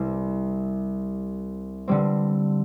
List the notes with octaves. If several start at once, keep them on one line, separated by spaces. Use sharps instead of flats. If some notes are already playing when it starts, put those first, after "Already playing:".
Already playing: C2 C3 G3 C4
D3 G3 C4